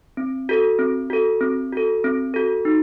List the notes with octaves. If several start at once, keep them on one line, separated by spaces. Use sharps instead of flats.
C4
F#4 A4
C4
F#4 A4
C4
F#4 A4
C4
F#4 A4
D#4